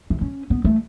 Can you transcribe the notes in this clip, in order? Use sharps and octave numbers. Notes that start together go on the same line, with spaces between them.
E3
C#4
B3
A3